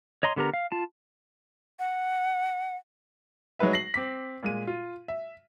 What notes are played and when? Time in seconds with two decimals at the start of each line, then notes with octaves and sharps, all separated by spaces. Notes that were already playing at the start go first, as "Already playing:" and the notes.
0.23 C#5 D#5 A#5 C6
0.36 D3 B3 G4 A#4 A#5
0.54 F5
0.72 F4 A5
1.79 F#5
3.59 F#3 G#3 D#4 B4 E5
3.73 A#6 C7 F#7
3.94 C4 D6 B6
4.43 A#2 G#3 D#7
4.67 F4
5.08 E5